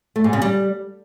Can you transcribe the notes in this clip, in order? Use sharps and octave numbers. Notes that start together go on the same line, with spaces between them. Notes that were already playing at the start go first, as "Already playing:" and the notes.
A3
G#2
C#3
G3